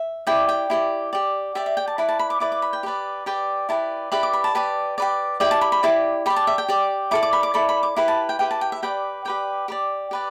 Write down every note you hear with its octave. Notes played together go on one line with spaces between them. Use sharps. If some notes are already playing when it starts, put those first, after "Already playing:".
Already playing: E5
E4 G4 D5 G5
G5
E4 G4 D5
G4 D5
G4 D5 E5
E5
G5
A5
E4 B4 D5 B5
A5
B5
D6
E4 B4 D5 D6
D6
B5
G5
G4 B4 D5
G4 B4 D5 G5
E4 G4 B4 D5 A5
E4 G4 B4 D5 B5
D6
B5
A5
G4 B4 D5
G4 B4 D5
E4 G4 D5 G5
A5
B5
B5
E4 G4 D5 D6
G4 D5 B5
A5
E5
G5
G4 D5
E4 A4 D5 D6
D6
B5
D6
E4 A4 D5 B5
B5
D6
E4 G4 B4 B5
A5
G5
E4 G4 B4 G5
A5
G5
E5
G4 B4 D5 G5
G4 B4 D5 G5
G4 B4 D5
G4 B4 D5